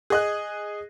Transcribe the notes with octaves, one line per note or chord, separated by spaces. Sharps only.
G#4 D#5 F#6